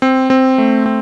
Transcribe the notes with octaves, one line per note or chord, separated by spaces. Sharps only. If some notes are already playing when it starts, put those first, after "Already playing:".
C4
C4
A3
C4